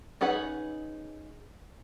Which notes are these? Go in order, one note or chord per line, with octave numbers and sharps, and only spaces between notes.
C#4 D#4 G#4 B4 F#5